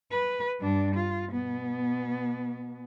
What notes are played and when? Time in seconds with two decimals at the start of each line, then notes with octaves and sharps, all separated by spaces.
0.11 B4
0.60 G2 D4
0.95 F4
1.32 B2 B3